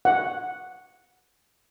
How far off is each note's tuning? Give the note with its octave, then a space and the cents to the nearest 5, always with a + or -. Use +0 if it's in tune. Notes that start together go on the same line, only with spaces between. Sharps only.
F#5 -5